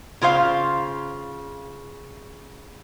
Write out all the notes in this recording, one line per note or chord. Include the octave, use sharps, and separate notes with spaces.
C#3 F4 C5 F5